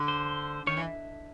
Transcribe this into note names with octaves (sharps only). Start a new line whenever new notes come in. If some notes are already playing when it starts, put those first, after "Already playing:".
Already playing: D3
C5
D#3 C#5
E3